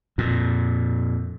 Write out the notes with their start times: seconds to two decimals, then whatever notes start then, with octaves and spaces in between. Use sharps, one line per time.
0.18 F2 A#2